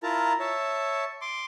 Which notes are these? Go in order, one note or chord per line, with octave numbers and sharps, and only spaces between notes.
E4 F4 A#4 A5 A#5
C#5 E5 A5
C6 D6